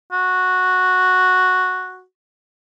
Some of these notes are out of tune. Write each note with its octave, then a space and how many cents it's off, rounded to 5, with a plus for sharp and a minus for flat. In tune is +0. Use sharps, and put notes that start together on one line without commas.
F#4 -5